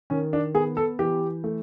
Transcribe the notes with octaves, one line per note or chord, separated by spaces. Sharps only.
D#3 C#4
D4
B3 G#4
A4
E3 G4
A3